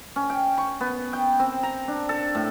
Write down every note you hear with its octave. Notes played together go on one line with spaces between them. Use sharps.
C#4
G5
C#6
B3
G5
C4
A#5
D4
A4
A2